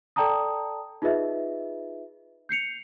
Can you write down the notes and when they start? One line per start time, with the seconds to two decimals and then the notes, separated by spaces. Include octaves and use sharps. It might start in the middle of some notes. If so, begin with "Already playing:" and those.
0.16 A4 D5 G5 A5 A#5 D#6
1.02 D#4 F4 G#4 B4 D#5 E5
2.49 G6 C7 C#7 F7